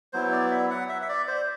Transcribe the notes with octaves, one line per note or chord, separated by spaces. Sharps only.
F#3 B3 E4 C5
D5
E5
F#5
E5
E5
D5
C5